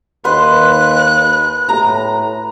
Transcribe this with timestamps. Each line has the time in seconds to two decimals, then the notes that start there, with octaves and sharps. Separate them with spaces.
0.25 D#2 B4 C6 F#6
1.69 A2 A#5